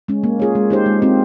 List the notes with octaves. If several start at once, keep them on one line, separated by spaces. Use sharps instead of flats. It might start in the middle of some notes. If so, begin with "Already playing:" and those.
G#3 C#4
A#3
F4 G#4 C#5
G#3
D#4 G4 C5
G#3
C4 F4